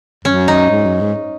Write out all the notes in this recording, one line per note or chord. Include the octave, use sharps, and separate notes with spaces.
F#2 C#4
D#4
G#2
F#2
G#2